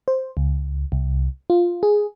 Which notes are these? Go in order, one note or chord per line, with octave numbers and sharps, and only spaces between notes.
C5
C#2
C2
F4
G#4